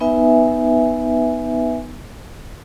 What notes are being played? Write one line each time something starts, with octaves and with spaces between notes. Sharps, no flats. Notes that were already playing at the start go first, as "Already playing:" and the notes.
B3 D#4 B4 E5 G#5